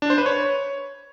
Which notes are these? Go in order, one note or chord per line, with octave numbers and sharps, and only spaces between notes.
D4
C5
B4
C#5